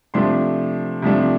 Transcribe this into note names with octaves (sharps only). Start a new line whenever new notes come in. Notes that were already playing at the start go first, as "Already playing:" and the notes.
C3 F3 A3 D4 C6
C3 F3 A3 D4